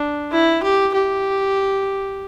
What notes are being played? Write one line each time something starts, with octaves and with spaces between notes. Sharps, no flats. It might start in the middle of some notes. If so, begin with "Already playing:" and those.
Already playing: D4
E4
G4
G4